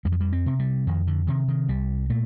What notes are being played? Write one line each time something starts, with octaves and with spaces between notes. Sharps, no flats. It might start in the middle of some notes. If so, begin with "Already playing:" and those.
F2 G3
F3
G3
C4
C3
G3
F2 D#3
D3
C3 D#3
D#3
C2 G3
A#2 A3